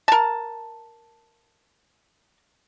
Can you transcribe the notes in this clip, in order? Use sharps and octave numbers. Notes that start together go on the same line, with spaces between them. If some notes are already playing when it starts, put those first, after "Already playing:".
A#4 A5